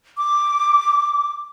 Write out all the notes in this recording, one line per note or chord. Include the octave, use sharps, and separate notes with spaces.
D6